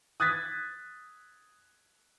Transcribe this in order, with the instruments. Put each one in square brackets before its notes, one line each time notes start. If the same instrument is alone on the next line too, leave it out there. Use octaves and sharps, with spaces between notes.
[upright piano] D#6 F#6 G#6 A6 B6